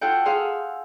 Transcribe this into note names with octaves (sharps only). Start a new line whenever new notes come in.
F4 F#4 A4 F#5 G5
G#4 F5 F#5 G#5 C6 E6